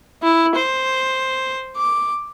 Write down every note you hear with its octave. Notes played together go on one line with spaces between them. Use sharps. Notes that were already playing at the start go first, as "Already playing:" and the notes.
E4
C5
D6